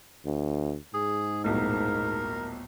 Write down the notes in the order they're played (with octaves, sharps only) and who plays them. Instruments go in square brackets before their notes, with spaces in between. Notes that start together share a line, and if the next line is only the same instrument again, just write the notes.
[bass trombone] D2
[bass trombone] G#2 [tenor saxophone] G#4
[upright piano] D#1 B1 A2 [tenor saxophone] A#4